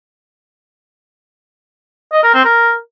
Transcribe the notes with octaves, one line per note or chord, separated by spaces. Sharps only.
D#5
A#4
C4
A#4